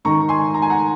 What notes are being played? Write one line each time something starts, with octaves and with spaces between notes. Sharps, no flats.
G#2 D#3 A#5 C#6
G#5 C6
A#5
G#5
F#5 A#5